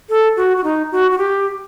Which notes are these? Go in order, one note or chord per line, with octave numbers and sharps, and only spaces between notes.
A4
F#4
F#4
D#4
F#4
F#4
G4